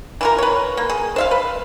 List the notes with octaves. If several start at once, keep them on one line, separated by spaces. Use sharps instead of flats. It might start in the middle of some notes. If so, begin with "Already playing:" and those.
E3 F4 A#4
B4 C#5
A#3
G#4
C5 E5 F5
B4